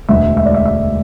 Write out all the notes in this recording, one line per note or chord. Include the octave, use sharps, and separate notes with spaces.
E1 D2 D3 G#3 E5
E5
D5
E5
E5